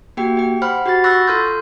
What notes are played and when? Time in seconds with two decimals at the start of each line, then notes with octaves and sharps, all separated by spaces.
0.17 A#3 F#4 G4 G5
0.37 G4 G5
0.62 C5 F#5 B5 F6
0.86 F#4 G4 F#5 B5 A6
1.04 B5 C#6 E6 F#6 A6 A#6
1.27 F4 A4 C6 F6 G6